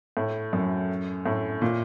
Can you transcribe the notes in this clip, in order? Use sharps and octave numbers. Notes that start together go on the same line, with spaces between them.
A2
F#2
A2
A#2